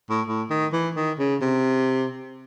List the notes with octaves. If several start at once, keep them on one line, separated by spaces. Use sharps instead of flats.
A2
A2
D#3
E3
D#3
C#3
C3